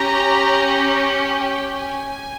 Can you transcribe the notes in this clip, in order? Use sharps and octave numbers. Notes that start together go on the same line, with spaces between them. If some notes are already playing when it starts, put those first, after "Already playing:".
Already playing: C#4 G4 A#5
G5
G#5